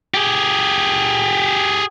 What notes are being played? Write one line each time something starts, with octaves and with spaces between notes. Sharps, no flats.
G4 G#4